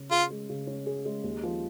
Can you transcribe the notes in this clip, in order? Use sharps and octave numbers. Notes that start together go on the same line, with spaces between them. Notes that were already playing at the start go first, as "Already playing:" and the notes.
Already playing: C#3 C#4
F4 G#4
G#3
C#3
C#4
G#4
G#3
D#2
F3